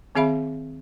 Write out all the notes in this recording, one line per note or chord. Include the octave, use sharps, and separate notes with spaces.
D#3 C4 G#4 E5 F5 B5